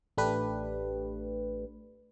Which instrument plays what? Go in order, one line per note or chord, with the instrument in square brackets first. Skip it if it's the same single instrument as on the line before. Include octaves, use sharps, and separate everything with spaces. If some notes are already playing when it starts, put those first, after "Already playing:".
[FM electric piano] A1 A3 D4 G4 B4